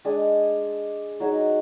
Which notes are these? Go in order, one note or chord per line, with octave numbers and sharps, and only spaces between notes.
G#3 D4 G#5 D#6
F#3 D#4 F#4 G#4